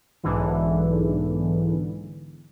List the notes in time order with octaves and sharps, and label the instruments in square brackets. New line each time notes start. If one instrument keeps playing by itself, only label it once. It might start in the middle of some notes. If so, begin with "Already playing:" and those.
[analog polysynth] B1 G#2 D3 E3